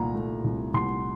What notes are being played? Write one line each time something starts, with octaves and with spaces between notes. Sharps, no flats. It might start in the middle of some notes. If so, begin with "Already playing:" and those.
Already playing: C2 A#2 A3 A#5
A3
C2
C2 C6